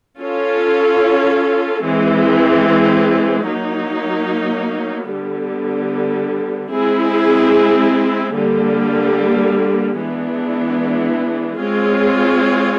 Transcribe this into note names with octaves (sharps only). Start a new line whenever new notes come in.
C#4 F4 A4 C#5
E3 G#3 C4
F#3 A#3 D#4
D3 G3 B3
G#3 C4 E4 G#4
D3 G3 A#3
E3 G#3 B3 D4
G#3 C4 F4 G#4 C#5